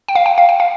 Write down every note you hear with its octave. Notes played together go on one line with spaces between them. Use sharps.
G5
F5
G5
F5
G5
F5